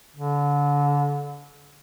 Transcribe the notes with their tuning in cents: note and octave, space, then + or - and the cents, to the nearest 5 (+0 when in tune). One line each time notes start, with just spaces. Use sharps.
D3 -30